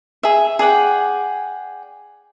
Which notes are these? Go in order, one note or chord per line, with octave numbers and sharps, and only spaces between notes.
G#4 E5
G#4 D5 F#5 G5